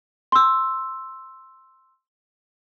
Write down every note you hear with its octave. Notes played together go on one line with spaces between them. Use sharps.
C6 E6